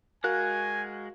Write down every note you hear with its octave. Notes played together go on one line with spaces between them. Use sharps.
G#3 F#4 A#4 F5 G#5 F#6